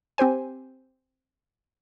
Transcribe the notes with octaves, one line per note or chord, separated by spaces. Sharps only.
C4 G4 C5 G#5